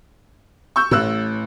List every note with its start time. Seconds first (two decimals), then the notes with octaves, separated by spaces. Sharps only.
0.76 C#6 E6 G6
0.91 A1 A2 E6 F#6